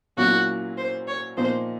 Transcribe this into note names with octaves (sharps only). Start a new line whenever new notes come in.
A#2 F#3 A#3 C#4 E4 F#4
C5
C#5
A#2 F3 A#3 D#4 C5